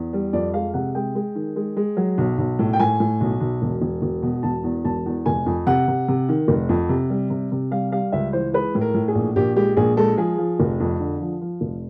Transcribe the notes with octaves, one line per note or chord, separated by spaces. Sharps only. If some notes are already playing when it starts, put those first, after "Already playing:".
Already playing: E2
G3
F2 D5
G#3 F5
C3 F#5
G#3 G5
G#3
D#3
G#3
G#3
F#3
B1
B1
A2
G5
A2 G#5
A2
B1
B1
E1
E1
E1
B2
E1 A5
E2
E1 A5
E2
F1 G#5
F2
C3 F#5
C3
C3
D#3
F1
F2
C3
G3
C3
C3
G3 F5
G3 F5
C#2 E5
E3 C5
G#3 B4
A2
A#4
A2
G#4
A#1
A#1 G4
G#3 G4
A#1 G#4
G#3 A4
F3 G#4
F3
F1
F2
D3
F3
F3
F1